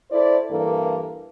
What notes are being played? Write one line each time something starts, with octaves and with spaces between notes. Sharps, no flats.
E4 A4 C5 D5
G2 E3 A#3 A4